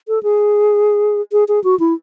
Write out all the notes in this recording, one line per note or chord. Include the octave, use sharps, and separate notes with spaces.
A4
G#4
G#4
G#4
F#4
E4